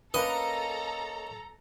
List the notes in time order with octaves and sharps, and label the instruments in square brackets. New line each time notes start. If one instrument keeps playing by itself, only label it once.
[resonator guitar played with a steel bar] A#3 C#4 [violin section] A4 A#5 [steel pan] B4 [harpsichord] D#5